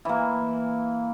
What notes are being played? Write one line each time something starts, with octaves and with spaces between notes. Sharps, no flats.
E3 A#3